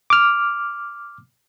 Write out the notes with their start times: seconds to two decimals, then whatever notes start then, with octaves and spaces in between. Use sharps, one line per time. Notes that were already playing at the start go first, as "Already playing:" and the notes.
0.10 D6 F6